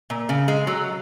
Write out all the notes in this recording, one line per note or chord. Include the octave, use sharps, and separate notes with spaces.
A#2
C#3
G#3
F#3